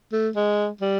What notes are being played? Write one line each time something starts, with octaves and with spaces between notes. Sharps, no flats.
A3
G#3
G3